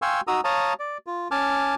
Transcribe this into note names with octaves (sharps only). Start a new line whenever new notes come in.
F5 G5 G#5 C6 C#6 E6
D#4 F#4 A#5 D#6 E6
C#5 F5 A5 A#5 D#6
D5
F4
C#4 G#5 A5 D6 F6